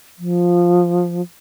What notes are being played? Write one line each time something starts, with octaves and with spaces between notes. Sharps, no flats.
F3